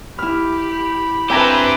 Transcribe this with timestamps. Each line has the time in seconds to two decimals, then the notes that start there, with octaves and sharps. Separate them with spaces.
0.19 E4 G4 B5 F6
1.30 C4 D4 G4 B4 E5 G#5 A#5